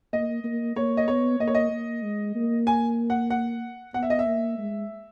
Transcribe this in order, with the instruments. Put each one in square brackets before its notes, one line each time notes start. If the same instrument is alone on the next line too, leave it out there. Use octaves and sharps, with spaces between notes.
[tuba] A#3 [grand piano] D#5
[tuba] A#3
[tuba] A#3 [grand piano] C#5
[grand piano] D#5
[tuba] B3 [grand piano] C#5
[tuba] A#3 [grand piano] D#5
[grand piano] C#5
D#5
[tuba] A#3
G#3
A#3
[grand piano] G#5
F#5
F#5
[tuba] B3 [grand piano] F#5
[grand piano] E5
D#5
E5
[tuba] A#3
G#3